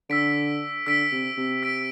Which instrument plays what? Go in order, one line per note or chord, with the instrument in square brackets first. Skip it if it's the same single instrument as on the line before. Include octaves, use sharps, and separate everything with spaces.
[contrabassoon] D3 [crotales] E6 B6 D7
[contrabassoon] D3 [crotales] E6 B6 D7
[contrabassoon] C3
C3
[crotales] E6 B6 D7